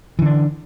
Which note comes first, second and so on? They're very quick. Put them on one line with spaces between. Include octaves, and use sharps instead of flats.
E3 D3 D4